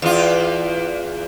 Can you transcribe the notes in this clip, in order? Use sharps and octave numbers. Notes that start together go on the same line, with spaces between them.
E2 F4